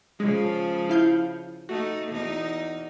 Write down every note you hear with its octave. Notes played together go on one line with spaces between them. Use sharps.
C#3 F3 G#3
E4 F5 G6
A3 D#4 F#4
E2 D#4